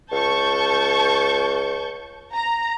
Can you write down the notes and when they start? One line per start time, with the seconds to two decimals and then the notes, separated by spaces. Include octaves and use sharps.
0.12 C#2 A5 C#6 G6
2.32 A#5